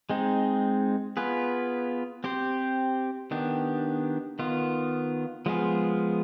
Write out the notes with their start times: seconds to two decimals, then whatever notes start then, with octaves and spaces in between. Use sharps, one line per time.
0.10 G#3 C4 D#4
1.17 B3 F4 G#4 B4
2.24 C4 G4 C5
3.31 D#3 B3 D4 G4
4.39 D#3 B3 F4
5.46 F3 G#3 B3 F4 G#4